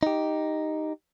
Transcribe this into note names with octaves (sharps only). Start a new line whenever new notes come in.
D#4 G4